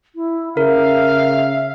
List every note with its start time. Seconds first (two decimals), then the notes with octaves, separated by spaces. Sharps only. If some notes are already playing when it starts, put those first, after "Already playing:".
0.15 E4
0.57 C#3 A#4 E5 F5